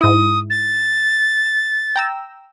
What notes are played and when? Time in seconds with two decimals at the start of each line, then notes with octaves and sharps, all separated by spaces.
0.01 G#2 E4 D#6
0.50 A6
1.96 G5 A#5 E6